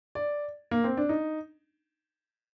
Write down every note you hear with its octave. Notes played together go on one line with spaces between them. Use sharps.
D5
A#3
C4
D4
D#4